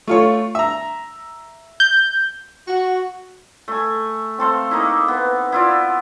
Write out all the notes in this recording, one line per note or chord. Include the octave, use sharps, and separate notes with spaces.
A3 F4 C#5
E5 A#5
G6
F#4
A3 G#5
C4 A4 C5 F5
A#3 D#4 E4
B3
E4 F4 D5